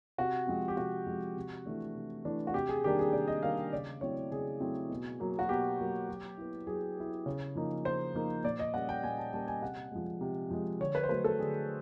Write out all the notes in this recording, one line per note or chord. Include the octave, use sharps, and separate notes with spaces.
C3 F#4
F3 G#3 C4
G4
C3 F#4
F3 G#3 C4
C3
E3 A3 D4
C3
E3 A3 D4
F#4
C3 G4
G#4
D#3 G3 A#3 D4 G4
G#4
C3 D5
D#5
D#3 G3 A#3 D4 F5
C#3 D5
F#3 A3 C4 E4 C#5
C#3 G#4
F#3 A3 C4 E4
B2
F#3 A#3
F#4
B2 G4
F#3 A#3
F#3
B3 E4
F#3 G#4
B3 E4
C#3
F3 A#3 D#4
C#3 C5
F3 A#3 D#4
A#2 D5
D#5
G3 A#3 C#4 F#5
G5
A#2 G#5
A5
G3 A#3 C#4 A5
G#5
C3 F#5
F3 G#3
C3
F3 G#3
D3 C#5
B4
C5
F#3 A3 B4
A4
D3 G#4